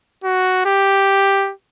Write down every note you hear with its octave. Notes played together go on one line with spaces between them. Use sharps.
F#4
G4